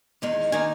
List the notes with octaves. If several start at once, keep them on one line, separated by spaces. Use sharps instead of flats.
E2 D#3 G#3 D#4
D#3 A#3 D#4 G#5